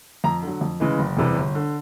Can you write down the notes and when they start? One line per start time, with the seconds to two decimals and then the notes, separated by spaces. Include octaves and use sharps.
0.24 F2 A#5
0.42 D3 F#3
0.61 F2
0.80 C#3 E3 G#3
0.99 F#1
1.17 E2 C3 E3 G3
1.36 G1
1.55 D3